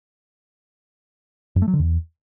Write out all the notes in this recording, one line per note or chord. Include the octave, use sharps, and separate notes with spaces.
F#2
A3
F#3
D3
E2